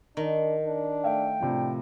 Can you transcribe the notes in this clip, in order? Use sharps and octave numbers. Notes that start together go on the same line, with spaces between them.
D#3 D4
D4
A3 E5 F5 G5
A2 C3 F3 D4